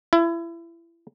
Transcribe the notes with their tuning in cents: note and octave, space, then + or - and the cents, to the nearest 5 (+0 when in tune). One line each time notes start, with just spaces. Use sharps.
E4 +30